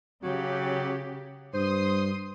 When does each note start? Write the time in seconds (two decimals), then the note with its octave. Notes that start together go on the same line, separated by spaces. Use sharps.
0.23 C#3 F#3 G4
1.54 G2 C5 C6 D#6